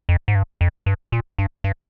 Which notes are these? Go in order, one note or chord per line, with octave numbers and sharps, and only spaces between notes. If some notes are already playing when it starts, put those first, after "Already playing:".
F2
G#2
G2
F2
G2
A#2
G2
G2